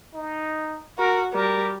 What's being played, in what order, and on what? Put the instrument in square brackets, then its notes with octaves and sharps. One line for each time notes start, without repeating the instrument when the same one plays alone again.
[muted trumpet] D#4
[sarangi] F#4 [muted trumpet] A#4
[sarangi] G3 [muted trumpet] A#4